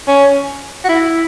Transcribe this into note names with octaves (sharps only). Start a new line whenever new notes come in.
C#4
F#4
E4